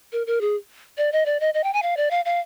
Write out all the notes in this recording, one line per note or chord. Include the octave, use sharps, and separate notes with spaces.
A#4
A#4
G#4
D5
D#5
D5
D#5
D#5
G5
G#5
F5
D5
F5
F5